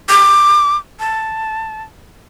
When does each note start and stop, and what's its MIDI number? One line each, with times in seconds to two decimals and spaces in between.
0.09 0.77 86
0.99 1.82 81